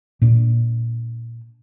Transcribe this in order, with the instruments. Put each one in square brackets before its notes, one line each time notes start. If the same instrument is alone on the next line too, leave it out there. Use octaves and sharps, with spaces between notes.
[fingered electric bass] A#2 D4